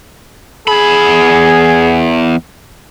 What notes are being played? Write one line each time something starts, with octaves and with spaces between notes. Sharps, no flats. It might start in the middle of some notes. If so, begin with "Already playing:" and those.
E2 G#4 B5